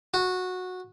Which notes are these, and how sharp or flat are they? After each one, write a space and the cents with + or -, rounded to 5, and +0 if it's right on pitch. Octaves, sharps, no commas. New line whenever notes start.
F#4 -15